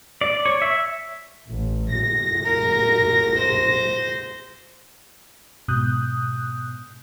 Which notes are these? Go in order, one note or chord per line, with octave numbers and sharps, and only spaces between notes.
D5
C#5
E5
A1
A#6
A#4
C5
G#2 B2 D#6 F#6 G6